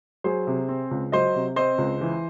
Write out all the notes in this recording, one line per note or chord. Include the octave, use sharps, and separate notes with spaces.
F#3 G#4 C5
C3
C4
C#2
F#3 C5 D#5
C3
C4 C5 D#5
C#2
E3